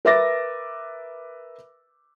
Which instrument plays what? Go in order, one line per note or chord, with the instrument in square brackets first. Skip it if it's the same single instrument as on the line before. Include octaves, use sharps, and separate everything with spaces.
[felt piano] A#4 B4 E5 D6 A6 A#6